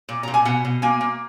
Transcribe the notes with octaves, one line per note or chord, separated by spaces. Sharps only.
A#2
A#2 A#5
G#5
B2 F#5
B2
A#3 G#5
A#3